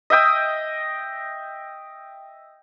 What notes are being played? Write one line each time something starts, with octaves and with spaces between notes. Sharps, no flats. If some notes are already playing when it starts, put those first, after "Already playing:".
D#5 E5 G5 D#6